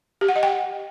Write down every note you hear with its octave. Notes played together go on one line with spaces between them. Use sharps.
G4
F#5
D#5
G5